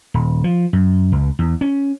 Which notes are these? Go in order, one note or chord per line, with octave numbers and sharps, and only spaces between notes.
D#1
F3
F#2
C#2
E2
C#4